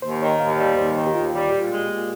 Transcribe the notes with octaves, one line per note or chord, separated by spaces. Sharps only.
D#2 C5
D#3 C#5
D#2 F5
G3 D#5
D#2 C5
D#3
G4
D#2 F4
G3
A#2 G4
G#3
A#2